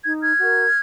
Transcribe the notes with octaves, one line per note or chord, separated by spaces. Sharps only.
D#4 G#6
F6 G#6
F#4 A#4